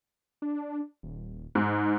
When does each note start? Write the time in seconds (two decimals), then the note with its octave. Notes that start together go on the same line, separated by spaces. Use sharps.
0.42 D4
1.03 D#1
1.55 G#2 D#4